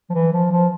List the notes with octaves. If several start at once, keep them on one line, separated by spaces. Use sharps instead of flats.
F3
E3
F3
F3